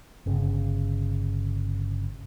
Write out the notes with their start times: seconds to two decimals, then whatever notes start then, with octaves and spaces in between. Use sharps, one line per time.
0.26 G1 C#3